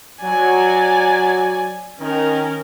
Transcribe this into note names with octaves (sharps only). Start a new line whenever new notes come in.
F#3 D5 G#5
D#3 C#4 A#4